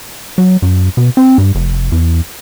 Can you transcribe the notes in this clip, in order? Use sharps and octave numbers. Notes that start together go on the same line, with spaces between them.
F#3
F#2
B2
C4
G2
F1
E2